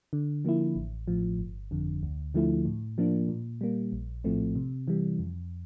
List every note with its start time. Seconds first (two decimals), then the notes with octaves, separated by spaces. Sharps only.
0.13 D3
0.45 F3 A#3 E4
0.76 A1
1.08 A2 F3
1.39 G1
1.71 F2 D3
2.03 D2
2.34 D3 F3 A3 E4
2.65 A2
2.98 F3 A#3 D4
3.29 A#2
3.61 G3 A#3
3.92 A#1
4.24 A2 F3 A3 C4
4.55 C3
4.88 E3 G3
5.19 F2